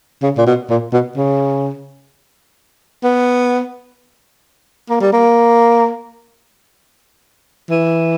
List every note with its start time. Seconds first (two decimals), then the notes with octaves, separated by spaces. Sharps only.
0.22 C#3
0.37 A#2
0.47 B2
0.69 A#2
0.92 B2
1.17 C#3
3.03 B3
4.90 A#3
5.01 G3
5.12 A#3
7.70 E3